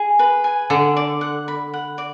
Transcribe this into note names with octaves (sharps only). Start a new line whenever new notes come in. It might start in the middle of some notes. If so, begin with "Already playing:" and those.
Already playing: G#4 G#5
B4
G#5
D3 D5
D5
F#5
B5
F#5
D5